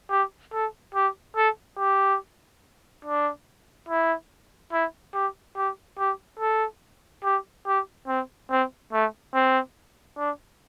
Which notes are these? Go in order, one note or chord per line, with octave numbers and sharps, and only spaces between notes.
G4
A4
G4
A4
G4
D4
E4
E4
G4
G4
G4
A4
G4
G4
C4
C4
A3
C4
D4